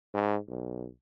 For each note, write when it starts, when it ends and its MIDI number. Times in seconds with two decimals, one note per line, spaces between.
0.14 0.37 44
0.48 0.87 35